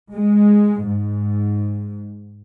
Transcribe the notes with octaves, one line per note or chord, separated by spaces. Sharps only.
G#3
G#2